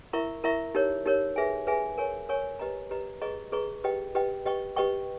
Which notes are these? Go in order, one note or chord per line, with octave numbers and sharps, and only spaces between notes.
E4 A#4 E5 A#5 C#6
E4 A#4 E5 A#5 C#6
D#4 G4 A#4 C#5
D#4 G4 A#4 C#5
G#4 B4 E5 G#5
G#4 B4 E5 G#5
A#4 C#5 G#5 C#6
A#4 C#5 G#5 C#6
G4 B4 D#5 A#5
G4 B4 D#5 A#5
G#4 B4 D#5 A#5 C#6
G#4 B4 D#5 A#5 C#6
G4 B4 D#5 G5
G4 B4 D#5 G5
G4 B4 D#5 G5 C#6
G4 B4 D#5 G5 C#6